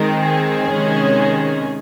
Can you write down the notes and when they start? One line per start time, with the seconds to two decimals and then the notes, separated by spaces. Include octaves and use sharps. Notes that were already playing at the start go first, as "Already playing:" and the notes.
Already playing: D#3 G#3 C4 A#4
0.25 G#4
0.70 C3 D#3 G#3 C#4